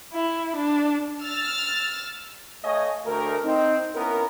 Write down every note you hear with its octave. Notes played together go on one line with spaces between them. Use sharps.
E4
D4
E6 F6 A6
A3 C#5 D#5 F5 G#5
D2 A3 A#4
C4 D#4
B3 C#4 E4 A#4